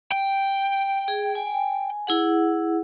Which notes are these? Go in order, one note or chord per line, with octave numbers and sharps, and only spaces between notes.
G5
G#4
G#5
E4 G#4 F#5